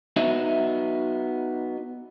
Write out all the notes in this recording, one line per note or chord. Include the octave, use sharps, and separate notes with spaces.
B3 D#4 F#4 E5